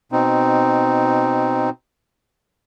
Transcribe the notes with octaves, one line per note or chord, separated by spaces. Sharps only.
B2 C4 D#4